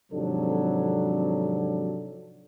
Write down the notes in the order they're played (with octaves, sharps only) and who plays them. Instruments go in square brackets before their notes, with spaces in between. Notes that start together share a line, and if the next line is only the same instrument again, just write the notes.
[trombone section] G#1 C3 F3 F#3 D4 A4